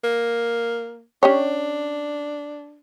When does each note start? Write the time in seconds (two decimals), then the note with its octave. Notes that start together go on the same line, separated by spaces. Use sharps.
0.04 A#3
1.23 C#4 D4 G4 C#5